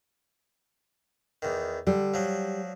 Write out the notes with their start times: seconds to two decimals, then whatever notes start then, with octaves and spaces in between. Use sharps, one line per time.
1.42 E2 D#3
1.87 D3 G3
2.14 F3 F#3